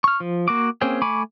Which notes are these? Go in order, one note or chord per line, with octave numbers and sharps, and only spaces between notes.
C#6 F6
F3
A#3 F#4 D6
A#3 C4 C#4 G#4 G5
A3 G#5 B5 C#6 D6